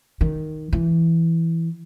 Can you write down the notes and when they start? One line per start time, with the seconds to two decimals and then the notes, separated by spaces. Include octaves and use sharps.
0.21 D#3
0.73 E3